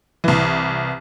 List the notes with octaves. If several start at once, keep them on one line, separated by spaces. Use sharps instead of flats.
C2 E3